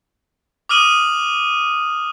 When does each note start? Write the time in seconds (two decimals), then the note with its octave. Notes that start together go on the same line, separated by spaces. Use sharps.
0.69 D6 D#6 F6 D#7 F#7